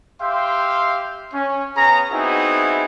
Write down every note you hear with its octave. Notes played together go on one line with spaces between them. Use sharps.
G4 E5 F5 G5 C6
C#4
B3 C#4 G#4 A#5
B3 C4 D#4 E4 F#4 G#4